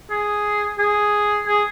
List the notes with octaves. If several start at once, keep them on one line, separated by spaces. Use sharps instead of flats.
G#4
G#4
G#4